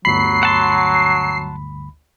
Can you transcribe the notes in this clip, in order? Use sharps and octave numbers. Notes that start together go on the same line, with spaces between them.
G1 D2 F#3 B5 C7
F#5 A5 C6